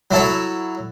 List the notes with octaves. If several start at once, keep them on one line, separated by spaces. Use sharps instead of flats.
F#3 E4 A4 C#5